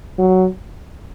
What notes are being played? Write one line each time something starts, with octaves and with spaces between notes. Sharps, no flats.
F#3